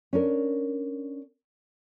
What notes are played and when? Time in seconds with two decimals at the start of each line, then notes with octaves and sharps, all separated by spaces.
0.13 C#4 D4 A#4